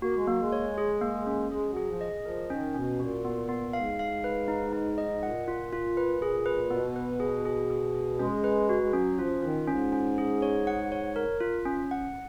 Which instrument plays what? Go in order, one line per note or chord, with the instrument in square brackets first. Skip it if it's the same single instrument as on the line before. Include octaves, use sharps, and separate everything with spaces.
[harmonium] A#3 [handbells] F#4
[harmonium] G#3
[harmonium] F#3 [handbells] A#3
[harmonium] G#3
[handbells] C#5
G#4
A#3
C#4
[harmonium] G#3 [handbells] G#4
[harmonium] F#3
[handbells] G#4
[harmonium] F3
[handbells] D#5
[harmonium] F3 [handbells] A#4
[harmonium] D#3 [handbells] C#4
[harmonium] B2 [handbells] C#4
[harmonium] A#2 [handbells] F#4
[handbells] B3
B3
[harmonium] G#2 [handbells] F5
[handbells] F5
B4
D#4
D#4
D#5
[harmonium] A#2 [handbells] F#5
[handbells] F4
F4
B4
G#4
B4
[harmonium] B2 [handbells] B3
[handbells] B4
G#4
G#4
G#4
G#4
[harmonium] G#3 [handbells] C#4
[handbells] B4
F#4
[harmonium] G#3
[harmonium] F#3 [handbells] C#4
[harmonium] F3 [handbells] F4
[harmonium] D#3 [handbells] F4
[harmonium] G#2 [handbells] C#4
[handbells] C#4
G#4
C#5
F#5
C#5
A#4
F4
C#4
F#5